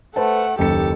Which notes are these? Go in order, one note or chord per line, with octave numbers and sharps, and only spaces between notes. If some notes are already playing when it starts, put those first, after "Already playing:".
A3 B4 C5 F#5 A5
F#1 D#2 G4 A4 C#7